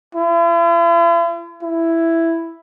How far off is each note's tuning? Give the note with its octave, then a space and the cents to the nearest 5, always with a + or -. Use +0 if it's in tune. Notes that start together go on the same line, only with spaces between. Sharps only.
E4 +45
E4 +5